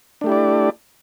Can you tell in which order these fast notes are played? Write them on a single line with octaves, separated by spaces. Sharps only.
D4 A3 G4 E4 D5